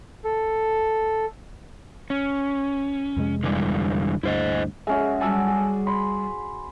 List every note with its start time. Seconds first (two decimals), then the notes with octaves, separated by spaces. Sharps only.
0.25 A4
2.10 C#4
3.17 F2 C3 G#3
3.43 D3 E3 G3
4.23 D2 G2 E4 C5 D#5
4.87 G#3 C#4 F#4 E5
5.21 F#3 G3 G#5 A5 D6 E6
5.48 G#4
5.87 B5 C6